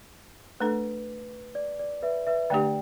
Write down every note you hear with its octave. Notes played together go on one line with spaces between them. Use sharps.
A3 D4 A4 B4
D5
D5
B4 E5
B4 E5
D3 A3 D4 G4 D5 G5